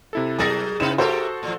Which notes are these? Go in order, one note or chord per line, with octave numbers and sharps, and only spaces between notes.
C3 E4 A4
F#3 G#4 A#4 D#6 A6 A#6
C#3 B3 D#4 E4 B4 E7
A3 F#4 G4 A4 A#4 C5
A2 F3